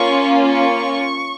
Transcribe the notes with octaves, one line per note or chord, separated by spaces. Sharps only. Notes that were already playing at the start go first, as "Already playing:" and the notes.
Already playing: A#3 C#4 F4 C#6
C#6